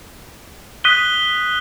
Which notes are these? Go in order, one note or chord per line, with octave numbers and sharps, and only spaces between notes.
D#6 F#6 B6 D#7 G7